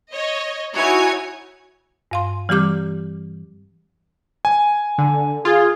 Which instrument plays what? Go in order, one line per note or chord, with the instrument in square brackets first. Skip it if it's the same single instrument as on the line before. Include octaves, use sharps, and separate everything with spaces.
[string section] C#5 D#5
D#4 E4 F#4 C#5 G#5 G#6
[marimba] G2 F5 C6
E3 G3 C4 G4 D6 G6
[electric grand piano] G#5
[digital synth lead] D3
[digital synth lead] F4 [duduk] G#4